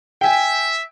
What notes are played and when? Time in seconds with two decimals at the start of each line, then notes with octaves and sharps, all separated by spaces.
0.21 E5 G5 G#5